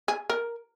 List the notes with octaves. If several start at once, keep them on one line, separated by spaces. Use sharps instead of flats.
G#4
A#4